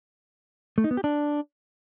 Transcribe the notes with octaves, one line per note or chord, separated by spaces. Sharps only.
A3
D#4
B3
G4
D4